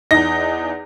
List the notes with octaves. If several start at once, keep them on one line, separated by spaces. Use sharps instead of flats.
E2 D#4 A#6